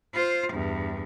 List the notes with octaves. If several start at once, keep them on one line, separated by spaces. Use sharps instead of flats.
F4 C5
E2 G2